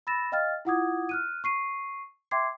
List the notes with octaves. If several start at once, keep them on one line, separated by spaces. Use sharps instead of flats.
B5 E6 A6 A#6 E7
D#5 F5 G5 F6 A6
E4 F4 F#5 D6 D#6 G#6
F6 F#6 D#7
C#6 C7 D#7
E5 G5 C6 D6 G#6 C7